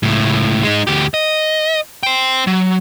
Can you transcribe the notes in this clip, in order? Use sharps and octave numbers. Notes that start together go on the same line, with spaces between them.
C#2 A2
G#3 D#4
D2 G4
D#5
C5 G5
F#3